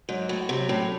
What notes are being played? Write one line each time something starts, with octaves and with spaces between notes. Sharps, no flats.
G#2 F#3
A2 F#4
C3 F#3
A2 C#4